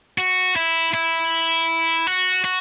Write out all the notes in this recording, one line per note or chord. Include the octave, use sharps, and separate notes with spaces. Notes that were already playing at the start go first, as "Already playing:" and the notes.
F#4
E4
E4
F#4
F#4